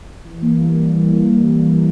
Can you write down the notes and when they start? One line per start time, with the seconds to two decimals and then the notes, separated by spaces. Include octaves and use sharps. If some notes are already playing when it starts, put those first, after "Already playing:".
0.25 E3
0.42 A#3
0.60 G3
0.78 E3
0.95 E3
1.12 A#3
1.30 G3
1.48 E3
1.65 E3